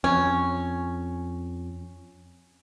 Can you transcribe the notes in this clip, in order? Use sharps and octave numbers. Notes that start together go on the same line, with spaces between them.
F2 C#4